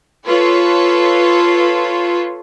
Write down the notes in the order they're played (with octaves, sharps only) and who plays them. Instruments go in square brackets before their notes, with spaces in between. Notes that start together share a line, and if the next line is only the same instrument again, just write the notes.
[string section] F4 A4 B4 C#5